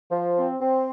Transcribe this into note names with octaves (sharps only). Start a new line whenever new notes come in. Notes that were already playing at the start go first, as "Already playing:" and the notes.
F3
C4
C4